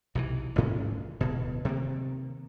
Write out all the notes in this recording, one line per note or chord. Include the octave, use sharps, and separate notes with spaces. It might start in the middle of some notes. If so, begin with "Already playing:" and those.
B1 C3 D#3 E3
A1 D2 G#2 C#4
D1 B2
C3 D#3 G3 A#3